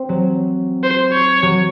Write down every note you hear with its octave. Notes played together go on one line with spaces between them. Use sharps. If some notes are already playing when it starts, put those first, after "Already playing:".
Already playing: C4
F#3
C5
C#5
F#3